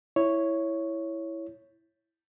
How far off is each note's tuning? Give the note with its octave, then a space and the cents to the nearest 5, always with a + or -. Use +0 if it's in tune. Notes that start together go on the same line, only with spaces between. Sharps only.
E4 +0 C#5 +0